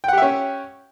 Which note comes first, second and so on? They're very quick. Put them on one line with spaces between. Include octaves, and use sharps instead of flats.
G5 F#5 G4 E5 C#4